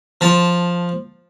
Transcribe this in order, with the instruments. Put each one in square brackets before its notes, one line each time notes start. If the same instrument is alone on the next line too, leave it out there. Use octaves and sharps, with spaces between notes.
[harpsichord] F3 A5